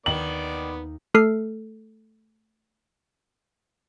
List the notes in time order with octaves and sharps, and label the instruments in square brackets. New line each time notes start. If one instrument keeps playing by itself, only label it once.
[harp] D#2 [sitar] D#3 [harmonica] B3 D5 [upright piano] F#7
[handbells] A3 A4 F6 C7